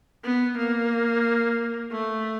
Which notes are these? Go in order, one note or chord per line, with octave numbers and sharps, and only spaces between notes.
B3
A#3
A3